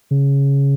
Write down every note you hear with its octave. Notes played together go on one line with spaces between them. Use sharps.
C#3